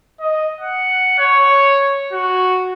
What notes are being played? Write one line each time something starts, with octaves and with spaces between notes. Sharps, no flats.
D#5
F#5
C#5
F#4